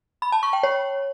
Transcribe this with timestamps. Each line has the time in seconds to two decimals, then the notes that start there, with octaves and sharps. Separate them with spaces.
0.22 B5
0.32 A5
0.43 C#6
0.53 G5
0.63 C#5